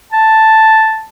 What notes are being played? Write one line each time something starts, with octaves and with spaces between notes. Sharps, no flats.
A5